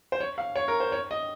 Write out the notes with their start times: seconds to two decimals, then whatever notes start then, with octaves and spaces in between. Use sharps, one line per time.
0.12 C5
0.20 C#5
0.38 F5
0.56 C#5
0.68 A#4
0.80 C5
0.92 C#5
1.11 D#5